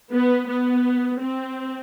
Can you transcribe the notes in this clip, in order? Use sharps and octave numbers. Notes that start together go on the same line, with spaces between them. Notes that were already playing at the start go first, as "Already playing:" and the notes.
B3
B3
C4